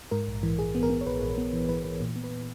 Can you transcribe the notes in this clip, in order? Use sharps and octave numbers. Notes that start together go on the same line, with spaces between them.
G#2 A#4
A#1
E3
A#1 G#4
B3
A#4
B3
C#5
A#1 B4
A#1
B3
E3
E3 B4
E3 B4
A#2
B3
B4